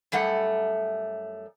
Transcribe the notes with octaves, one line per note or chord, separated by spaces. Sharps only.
F#2 G3 A3 F#5